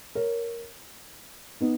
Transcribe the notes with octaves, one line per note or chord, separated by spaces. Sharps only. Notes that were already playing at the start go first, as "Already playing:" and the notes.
A#4 C#5
B3 D#4